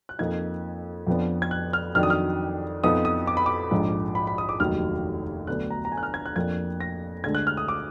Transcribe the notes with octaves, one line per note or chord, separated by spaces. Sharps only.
F#6
F2 F3 A#3 D#4 G#6
F2 F3 B3 D4
G#6
F#6
F6
F2 D#3 F#3 D4 F6
D#6
F6
F2 F3 B3 D#4 D#6
D#6
D6
B5
D6
A#1 G#2 F3
B5
B5
D#6
D6
F1 D#2 D#3 F#3 F6
D2 D3 F#3 B3 D4 F#6
A#5
A#5
G#5
F#6
F6
G#6
F#6
F2 F3 A#3 D4 G#6
A#6
D2 D3 G#3 G#6
F#6
F6
D#6
D6